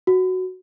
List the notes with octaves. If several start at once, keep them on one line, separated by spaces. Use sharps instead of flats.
F#4